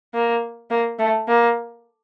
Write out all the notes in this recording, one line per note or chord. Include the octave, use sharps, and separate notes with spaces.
A#3
A#3
A3
A#3